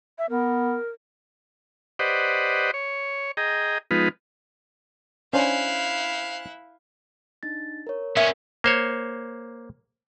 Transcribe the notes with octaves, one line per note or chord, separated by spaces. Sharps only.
E5
B3 A#4
G4 B4 C5 D5 D#5 F#5
C#5
G#4 D#5 G5 A#5
F3 G#3 B3 D#4 F4 B4
C#4 D4 E4 C5 F5 G#5 F#6
D4 D#4 A6
A#4 C#5
B3 C#4 A#4 E5
A#3 C5 C#5